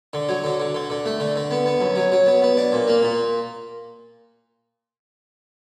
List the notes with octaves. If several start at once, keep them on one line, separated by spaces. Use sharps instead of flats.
D3
F#3
D3
D3
D3
D3
A3
D3
D3
B3
B3
F#2
F#3
F#3
B3
B3
D4
A#2
A#3
A#2